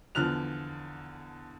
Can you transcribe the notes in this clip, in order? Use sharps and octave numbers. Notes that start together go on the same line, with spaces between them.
E2 D3 F3 F6 F#6 F7